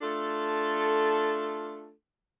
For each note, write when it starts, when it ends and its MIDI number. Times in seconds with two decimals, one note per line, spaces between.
0.02 1.92 57
0.02 1.92 62
0.02 1.92 65
0.02 1.92 69